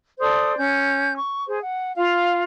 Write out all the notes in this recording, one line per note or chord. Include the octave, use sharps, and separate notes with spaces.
A4 C5 D5 D#6
C#4 G6
C#6
G#4 C5
F#5
F4 F5